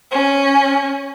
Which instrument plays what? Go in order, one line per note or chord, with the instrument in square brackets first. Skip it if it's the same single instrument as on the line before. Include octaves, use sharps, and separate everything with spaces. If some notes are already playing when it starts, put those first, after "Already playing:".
[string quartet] C#4